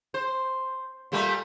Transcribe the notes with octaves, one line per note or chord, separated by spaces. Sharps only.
C5
A#2 G3 A3